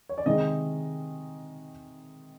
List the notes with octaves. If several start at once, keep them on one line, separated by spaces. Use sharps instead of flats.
C#5
D5
C3 D#3 G#3 D#5